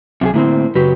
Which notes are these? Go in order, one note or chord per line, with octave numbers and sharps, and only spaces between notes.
C2 C3 F#3 F4 G#4
A2 D3 A#3 C4 E4
F#2 C#3 F#3 F#4 G4 B4